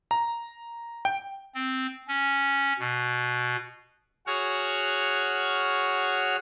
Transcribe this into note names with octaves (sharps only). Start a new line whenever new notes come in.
A#5
G5
C4
C#4
B2
F#4 G#4 C#5 F#5 C#6 F6